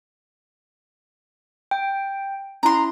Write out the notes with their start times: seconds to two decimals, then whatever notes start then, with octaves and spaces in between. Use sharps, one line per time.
1.71 G5
2.63 C#4 E4 A#5 C6